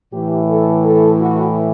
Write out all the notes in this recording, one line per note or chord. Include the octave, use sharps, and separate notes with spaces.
A2 E3 G4
A4
A4
F#4